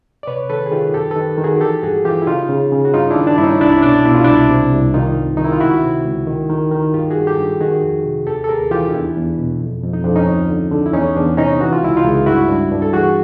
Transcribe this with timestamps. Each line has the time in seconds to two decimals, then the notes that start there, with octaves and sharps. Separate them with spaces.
0.23 D5
0.27 C3 B4 C#5
0.49 D#3 A4 B4
0.66 G#4
0.72 D#3 F4 G4
0.94 F#2 G4 A4
1.11 A4 B4
1.16 D#3
1.38 D#3
1.44 F#4 G#4
1.56 A#4
1.61 E3 G4 A4
1.83 G2 F#4 G#4
2.05 E3 F4 G4
2.22 E4
2.27 C#3 D#4 F4
2.49 C#3
2.72 C#3
2.85 F#4
2.94 G2 D#4 F4
3.10 D4 E4
3.17 D#3
3.27 D4
3.38 G2 E4
3.44 C#4 D#4
3.60 C2 D4 E4
3.77 C#4
3.82 B2 D4
4.05 B2 E4
4.15 F4
4.24 C2 D4 E4
4.49 C3
4.72 C2
4.94 D#3 D#4 F4
5.16 G2
5.37 D#3 D#4
5.44 E4
5.52 F4
5.60 C#2 E4 F#4
5.82 C3
6.05 C#2
6.27 D#3
6.50 D#3
6.72 D#3
6.94 G2 F4 G4
7.10 F#4 G#4
7.16 G2
7.27 G4 A4
7.38 G2
7.61 D#3 F#4 G#4
7.83 F2
8.04 C3
8.27 D#2 G4 A4
8.44 A4
8.49 D#2 G#4 A#4
8.71 E3 F4 G4
8.89 D#4
8.93 E2 D4 E4
9.16 E2
9.38 B2
9.60 F2
9.83 F2
9.93 D#4
10.04 F2 D4
10.16 C#4 D#4
10.27 D2
10.49 D3
10.72 D3
10.86 E4
10.93 E2 C#4 D#4
11.16 E2 D4
11.37 C3 C#4 D#4
11.60 E3 F#4
11.73 F4
11.83 C#2 E4
11.97 D#4 F4
12.04 C#2
12.26 G2 E4 F#4
12.49 G2
12.71 G2
12.82 A4
12.93 E3 F#4 G#4